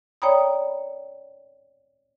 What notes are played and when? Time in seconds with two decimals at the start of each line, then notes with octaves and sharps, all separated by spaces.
0.22 C#5 D5 G5 A#5 B5 D#6